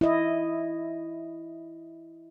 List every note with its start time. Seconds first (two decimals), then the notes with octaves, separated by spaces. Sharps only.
0.01 E4 D#5